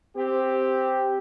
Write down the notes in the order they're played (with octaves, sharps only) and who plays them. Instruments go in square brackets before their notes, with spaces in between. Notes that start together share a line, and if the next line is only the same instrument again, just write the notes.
[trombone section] C4 G4